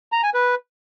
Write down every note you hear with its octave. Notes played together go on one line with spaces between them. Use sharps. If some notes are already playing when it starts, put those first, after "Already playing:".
A#5
G#5
B4